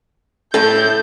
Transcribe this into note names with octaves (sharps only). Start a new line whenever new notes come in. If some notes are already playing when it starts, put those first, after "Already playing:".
A2 E4 A4 G6